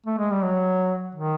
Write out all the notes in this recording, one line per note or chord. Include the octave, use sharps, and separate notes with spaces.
A3
G#3
G3
F#3
D#3